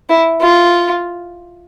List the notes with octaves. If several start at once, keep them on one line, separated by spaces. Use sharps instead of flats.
E4
F4